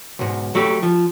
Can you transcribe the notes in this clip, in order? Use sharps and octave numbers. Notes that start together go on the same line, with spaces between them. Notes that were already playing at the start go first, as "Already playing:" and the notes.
B1 G#2
F#3 A3 G4
F3